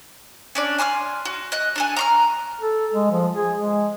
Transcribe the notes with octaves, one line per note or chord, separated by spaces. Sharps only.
C#4 D4 D5
G#5 C6 D6 F6
F#4
D#5 F#6
D4 A4 G#5
A#5 C6 F6
A4
G#3
F3
G#4
G#3